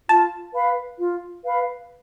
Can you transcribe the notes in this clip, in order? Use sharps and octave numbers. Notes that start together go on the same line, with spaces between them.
F4 A5
B4 F5 B5
F4
B4 F5 B5